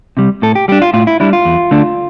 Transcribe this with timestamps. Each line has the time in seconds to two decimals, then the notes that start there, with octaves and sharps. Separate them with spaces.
0.17 C3 G3
0.42 A2 A4
0.55 G4
0.68 G3 D4 G4
0.82 F4
0.94 A2 F4
1.07 E4
1.20 G3 D4 E4
1.33 F4
1.45 E2
1.71 D3 A3 D4